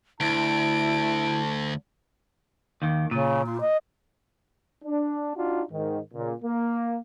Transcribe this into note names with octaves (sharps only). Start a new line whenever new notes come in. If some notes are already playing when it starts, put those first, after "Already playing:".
D2 E4 A5 D7
D#2 D#3
A#2 C#3
F4
D#5
D4
D4 D#4 F4 F#4
G#2 D#3
A#2 C#3
A#3